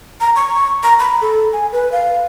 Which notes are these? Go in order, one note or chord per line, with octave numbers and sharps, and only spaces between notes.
A#5
C#6
A#5
B5
A4
G#5
B4
F5